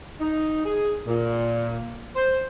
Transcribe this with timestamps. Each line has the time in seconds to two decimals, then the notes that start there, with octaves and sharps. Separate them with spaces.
0.20 D#4
0.65 G#4
1.07 A#2
2.15 C5